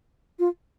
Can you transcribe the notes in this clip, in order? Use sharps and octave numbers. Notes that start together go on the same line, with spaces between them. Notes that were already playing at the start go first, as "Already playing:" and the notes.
F4